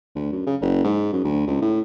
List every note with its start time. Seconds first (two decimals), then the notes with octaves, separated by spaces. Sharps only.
0.15 D2
0.32 F#2
0.47 C#3
0.61 F#1
0.84 G#2
1.13 F#2
1.24 D2
1.47 C#2
1.61 A2